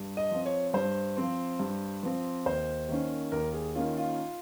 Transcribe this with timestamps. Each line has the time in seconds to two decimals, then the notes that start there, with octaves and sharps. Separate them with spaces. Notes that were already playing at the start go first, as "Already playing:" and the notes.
Already playing: G2
0.17 D#5
0.31 F3 C4
0.46 C#5
0.74 G2 C5
1.17 F3 C4
1.59 G2
2.03 F3 C4
2.46 D#2 C5
2.89 D#3 A#3 C#4
3.32 D#2 A#4
3.53 G#4
3.75 D#3 A#3 C#4 F4
3.97 F4